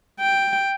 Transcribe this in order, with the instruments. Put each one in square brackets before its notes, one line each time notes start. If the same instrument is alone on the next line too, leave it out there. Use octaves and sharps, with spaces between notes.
[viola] G5